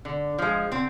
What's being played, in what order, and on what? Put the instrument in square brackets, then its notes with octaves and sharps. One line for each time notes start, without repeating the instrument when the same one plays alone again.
[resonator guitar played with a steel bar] D3
F3 G#3
D3 C4